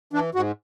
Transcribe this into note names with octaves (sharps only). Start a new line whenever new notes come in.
E3 D4
G#2 F#4